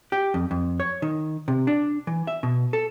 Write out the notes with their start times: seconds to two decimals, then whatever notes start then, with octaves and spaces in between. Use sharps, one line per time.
0.12 G4
0.34 F2
0.51 F2
0.80 C#5
1.02 D#3
1.48 C3
1.67 D4
2.07 E3
2.27 E5
2.43 B2
2.73 A4